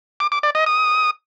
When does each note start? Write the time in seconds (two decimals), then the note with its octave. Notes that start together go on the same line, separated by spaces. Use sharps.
0.20 D6
0.32 D6
0.43 D5
0.55 D#5
0.66 D#6